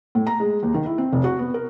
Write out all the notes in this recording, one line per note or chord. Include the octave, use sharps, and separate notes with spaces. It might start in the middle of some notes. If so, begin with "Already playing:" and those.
A2
A#5
G#3
D#2
D#3
E4
C4
F1
F#4
B3
A#4